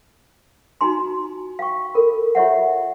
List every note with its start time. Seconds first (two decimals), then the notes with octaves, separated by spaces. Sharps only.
0.81 D#4 F4 F#4 G#5 A#5 C6
1.59 F5 G5 C#6
1.94 A4 A#4 B5
2.35 F4 G4 C#5 E5 F#5